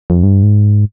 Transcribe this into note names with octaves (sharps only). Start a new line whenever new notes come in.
F2
G2
G#2